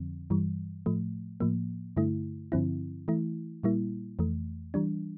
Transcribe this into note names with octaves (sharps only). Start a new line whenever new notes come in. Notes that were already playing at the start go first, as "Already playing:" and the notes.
Already playing: F2 D3 F3 C4
G2 E3 G3
A2 F3 A3
A2 F3 A#3
G2 D3 A3 E4
G2 D3 F3 C4 E4
E3 A3 E4
A#2 G3 A#3 E4
F2 E3 A3
E3 G3 D4